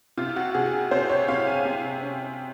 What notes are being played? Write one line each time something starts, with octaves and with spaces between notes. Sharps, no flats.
C3 F4
F#4
C3 G#4
C3 C5
C#5
C3 F5
G#5
C3
C#4